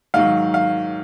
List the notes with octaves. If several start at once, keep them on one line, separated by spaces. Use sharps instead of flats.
G#2 D#3 F#3 F5
F5